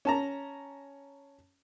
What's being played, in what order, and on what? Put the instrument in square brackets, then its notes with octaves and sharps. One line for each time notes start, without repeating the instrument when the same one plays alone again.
[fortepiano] C#4 A5 A#5